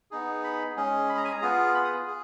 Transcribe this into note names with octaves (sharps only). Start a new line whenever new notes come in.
B3 D#4 G#4
B5
G#3 C#4 G#4
B5
A#5
G#5
A#5
B3 F4 G#4
B5
D#6
G#4